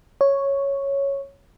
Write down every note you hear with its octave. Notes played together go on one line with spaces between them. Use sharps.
C#5